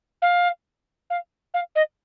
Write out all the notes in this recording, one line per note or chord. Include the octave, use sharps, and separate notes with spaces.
F5
F5
F5
D#5